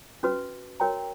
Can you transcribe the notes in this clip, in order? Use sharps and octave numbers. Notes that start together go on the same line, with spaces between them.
C#4 F#4 B4
F#4 A#4 C#5 G5 A#5